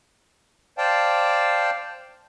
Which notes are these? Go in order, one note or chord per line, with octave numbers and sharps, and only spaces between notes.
C5 D5 F5 G5 A5